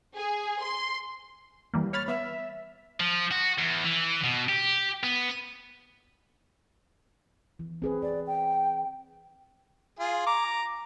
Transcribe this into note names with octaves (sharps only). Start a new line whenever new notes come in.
G#4
C6
E3 G3 A#3
C#5 B5 F6 A6
B3 E5
F3
F#4
E2
E3
B2
G4
B3
E3
C4 G#4 B4
B4 D5
G5
F4 G#4
A#5 D6